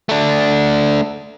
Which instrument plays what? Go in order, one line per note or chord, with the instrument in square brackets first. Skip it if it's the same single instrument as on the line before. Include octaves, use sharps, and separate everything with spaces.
[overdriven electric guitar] A3 D4